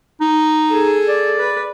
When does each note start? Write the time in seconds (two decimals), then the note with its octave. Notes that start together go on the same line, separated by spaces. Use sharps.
0.21 D#4
0.69 G#4 A4
1.08 D5
1.39 B4